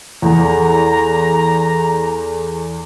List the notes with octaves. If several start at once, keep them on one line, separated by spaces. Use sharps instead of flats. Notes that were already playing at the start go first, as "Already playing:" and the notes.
E2 G#4 A4 A#5